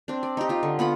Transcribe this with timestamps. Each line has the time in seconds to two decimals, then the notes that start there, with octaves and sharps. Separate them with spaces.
0.08 C4 D4
0.23 D5
0.37 D#4 G4
0.49 D#4 F4
0.63 D3
0.79 B3 F4 F#5 B5